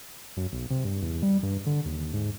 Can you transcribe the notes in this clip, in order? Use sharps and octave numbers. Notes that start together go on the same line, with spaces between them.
F#2
B1
C3
G2
E2
G3
G2
D3
D#2
G#2